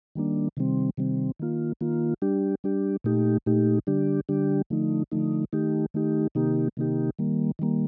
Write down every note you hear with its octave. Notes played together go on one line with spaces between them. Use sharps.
D#3 G3 A#3 D4
C3 D#3 G3 C4
C3 D#3 G3 C4
D#3 A#3 F4
D#3 A#3 F4
G3 D4 G4
G3 D4 G4
A#2 A3 D#4 G4
A#2 A3 D#4 G4
D3 G3 D4 G4
D3 G3 D4 G4
D3 F3 A3 D#4
D3 F3 A3 D#4
D#3 A3 D#4 G4
D#3 A3 D#4 G4
C3 D#3 A#3 D#4 G4
C3 D#3 A#3 D#4 G4
D#3 G3 A#3
D#3 G3 A#3